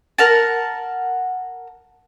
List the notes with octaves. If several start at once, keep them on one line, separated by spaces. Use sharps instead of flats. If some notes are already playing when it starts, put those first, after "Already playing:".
A#4 F#5 A5